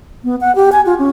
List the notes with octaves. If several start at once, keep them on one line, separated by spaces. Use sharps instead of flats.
B3
F#5
G4
G#5
F4
C#4